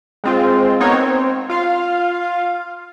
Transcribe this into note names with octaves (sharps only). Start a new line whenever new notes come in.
G#3 C4 F4
B3 D#4 A#4 C#5
C4
F4 F5